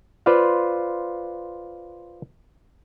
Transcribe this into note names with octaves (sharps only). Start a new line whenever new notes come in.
F4 B4 C5 D5 F5